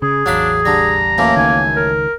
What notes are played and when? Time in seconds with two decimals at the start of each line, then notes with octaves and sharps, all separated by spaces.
0.02 C#3 G#4
0.26 A1 E2 F#3 D4 F5 B5
0.65 D3 G3 A#5
1.18 F#2 A2 E3 A#3
1.36 C#2 D#3 G#5
1.76 A#4